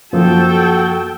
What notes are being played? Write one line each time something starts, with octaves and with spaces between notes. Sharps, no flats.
F#2 F3 A#3 F#4 A4 G5